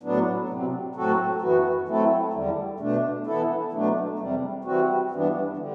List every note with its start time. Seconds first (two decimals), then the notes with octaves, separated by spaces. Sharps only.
0.03 A2 F#3 B3 D4
0.49 C3 F#3 C4
0.95 A2 F#3 C4 F#4 A4
1.41 F#2 E3 B3 F#4
1.88 F#3 A3 C4 E4 A4
2.33 E2 D3 G3
2.80 B2 A3 D4
3.27 E3 B3 E4 A4
3.72 B2 F#3 A3 D4
4.19 E2 C3 G3
4.65 E3 G3 C4 F#4
5.11 G2 E3 B3 D4
5.57 D3 G3